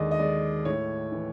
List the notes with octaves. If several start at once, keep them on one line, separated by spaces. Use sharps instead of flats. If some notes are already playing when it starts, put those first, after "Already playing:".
Already playing: D#2 D3 G#3 D5 D#5
D#5
G#3 D5
A2 C#5
E3